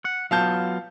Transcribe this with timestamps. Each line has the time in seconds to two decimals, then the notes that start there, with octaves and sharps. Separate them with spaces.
0.05 F#5
0.31 F#3 B3 F4 F5 A5 G6